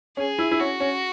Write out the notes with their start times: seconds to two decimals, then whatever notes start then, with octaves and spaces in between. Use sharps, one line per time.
0.17 C#4 G#4
0.39 E4
0.51 E4
0.60 C#4 F#4
0.80 C#4